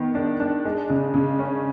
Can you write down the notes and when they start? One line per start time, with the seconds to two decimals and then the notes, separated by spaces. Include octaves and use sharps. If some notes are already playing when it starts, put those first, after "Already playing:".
Already playing: D#3 B3
0.15 D4
0.40 D4
0.65 G#3
0.90 C#3
1.14 C#3
1.39 C#4